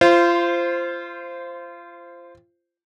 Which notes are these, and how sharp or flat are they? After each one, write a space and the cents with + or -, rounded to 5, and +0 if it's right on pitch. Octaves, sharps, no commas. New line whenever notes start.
F4 -25 C5 +0